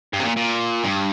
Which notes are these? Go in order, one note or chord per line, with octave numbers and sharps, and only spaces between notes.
G2
C3
A#2
A#2
G2